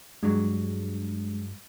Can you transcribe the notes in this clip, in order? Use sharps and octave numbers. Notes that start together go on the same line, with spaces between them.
G2 F#3 G#3 D4